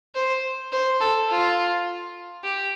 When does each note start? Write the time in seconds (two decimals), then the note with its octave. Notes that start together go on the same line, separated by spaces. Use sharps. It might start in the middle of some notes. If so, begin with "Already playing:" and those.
0.15 C5
0.72 C5
1.01 A4
1.30 F4
2.44 G4